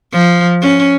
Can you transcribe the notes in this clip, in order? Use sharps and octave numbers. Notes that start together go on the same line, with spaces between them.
F3
C#4